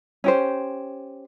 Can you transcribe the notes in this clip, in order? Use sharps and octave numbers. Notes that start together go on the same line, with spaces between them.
C#4 G4 C5